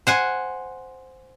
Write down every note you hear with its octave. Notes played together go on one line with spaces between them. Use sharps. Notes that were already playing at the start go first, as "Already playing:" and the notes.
C5 F#5 G#5